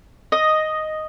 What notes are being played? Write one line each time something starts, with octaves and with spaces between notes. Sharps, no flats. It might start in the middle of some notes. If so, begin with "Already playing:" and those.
D#5